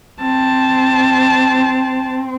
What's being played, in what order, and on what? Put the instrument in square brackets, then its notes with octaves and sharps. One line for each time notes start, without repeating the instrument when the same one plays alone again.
[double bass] C4 [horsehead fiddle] A5